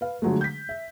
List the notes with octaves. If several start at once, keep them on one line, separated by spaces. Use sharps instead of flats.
B4 F5
D3 F3 F#3 G#3 A3
G6 B6
E5